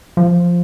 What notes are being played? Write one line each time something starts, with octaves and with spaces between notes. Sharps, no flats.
F3